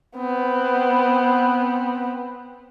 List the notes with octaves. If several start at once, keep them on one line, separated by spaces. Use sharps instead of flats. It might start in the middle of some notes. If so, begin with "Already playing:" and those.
B3 C4